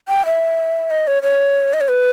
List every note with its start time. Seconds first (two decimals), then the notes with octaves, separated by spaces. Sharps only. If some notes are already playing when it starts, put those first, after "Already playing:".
0.08 G5
0.26 E5
0.91 D#5
1.07 C#5
1.23 C#5
1.73 D#5
1.81 C#5
1.88 B4